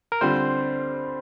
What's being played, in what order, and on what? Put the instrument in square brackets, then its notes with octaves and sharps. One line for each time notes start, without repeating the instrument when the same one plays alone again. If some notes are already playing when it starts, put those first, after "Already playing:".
[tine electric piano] A#4
[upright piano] D3 G3 C4 F4 [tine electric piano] C5